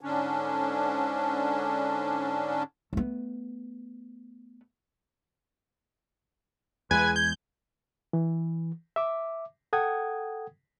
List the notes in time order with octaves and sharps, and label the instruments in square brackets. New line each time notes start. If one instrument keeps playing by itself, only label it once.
[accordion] G#2 D3 C#4 D4
[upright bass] A3 B3
[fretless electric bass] E2 G#3 [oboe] B4 [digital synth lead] G#5
[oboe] G#5 [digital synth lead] G6
[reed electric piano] E3
E5 D6
A4 F#5 G5 D#6 G#6